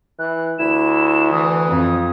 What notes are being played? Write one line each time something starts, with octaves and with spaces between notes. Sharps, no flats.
E3 F#6
D2 E4 E7
E3 D#6
F2